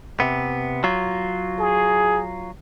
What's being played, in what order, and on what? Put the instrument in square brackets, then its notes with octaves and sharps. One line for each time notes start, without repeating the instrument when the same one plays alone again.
[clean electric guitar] C3 B3
F#3 F4
[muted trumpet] G#4